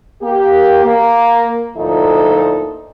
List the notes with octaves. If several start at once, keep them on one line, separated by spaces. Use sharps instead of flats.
A#3 G4
A#3
D2 A#2 F3 D#4 E4 A4